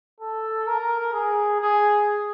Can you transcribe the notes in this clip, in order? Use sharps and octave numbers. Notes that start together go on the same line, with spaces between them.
A4
A#4
G#4
G#4